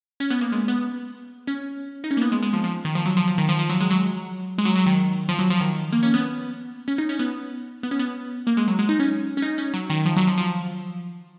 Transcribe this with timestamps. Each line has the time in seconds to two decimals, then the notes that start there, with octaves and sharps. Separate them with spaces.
0.20 C#4
0.30 B3
0.41 A#3
0.52 G#3
0.68 B3
1.47 C#4
2.04 D#4
2.11 C#4
2.17 A#3
2.22 B3
2.32 G#3
2.43 G#3
2.53 F3
2.64 F3
2.85 D#3
2.95 F3
3.06 F#3
3.17 F3
3.28 F3
3.38 D#3
3.49 F3
3.59 F3
3.70 F#3
3.80 G#3
3.91 F#3
4.58 G#3
4.65 F#3
4.76 F#3
4.86 D#3
5.29 F3
5.39 F#3
5.50 F3
5.61 D#3
5.93 A#3
6.03 C#4
6.14 B3
6.88 C#4
6.98 D#4
7.09 C#4
7.19 B3
7.83 B3
7.91 C#4
7.99 B3
8.47 A#3
8.57 G#3
8.68 F#3
8.79 G#3
8.89 D#4
8.99 C#4
9.37 C#4
9.42 D#4
9.58 C#4
9.74 F#3
9.90 D#3
10.05 F3
10.16 F#3
10.27 F3
10.38 F3